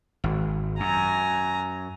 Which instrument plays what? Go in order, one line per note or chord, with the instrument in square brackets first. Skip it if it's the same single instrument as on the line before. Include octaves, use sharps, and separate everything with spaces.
[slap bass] G#1
[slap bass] F#2 [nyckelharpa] G#5 A#5